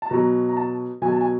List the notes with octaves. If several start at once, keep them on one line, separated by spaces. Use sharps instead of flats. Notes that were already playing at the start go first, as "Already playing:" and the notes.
A5
B2 F#3 A#5
A#5
A5
B2 F#3 G#5
A5
G#5